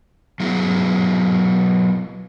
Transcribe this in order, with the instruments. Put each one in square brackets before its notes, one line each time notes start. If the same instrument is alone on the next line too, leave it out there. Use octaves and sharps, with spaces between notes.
[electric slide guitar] F#3 B3 E4 G#4